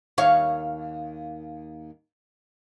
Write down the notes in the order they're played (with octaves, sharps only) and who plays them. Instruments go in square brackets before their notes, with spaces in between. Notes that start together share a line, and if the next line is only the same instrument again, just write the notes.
[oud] D#2 C#5 F5